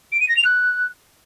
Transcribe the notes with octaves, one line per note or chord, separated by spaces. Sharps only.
D7
D#7
A#6
F7
F#6